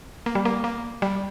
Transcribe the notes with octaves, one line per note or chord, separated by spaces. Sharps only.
A#3
G3
A#3
A#3
G3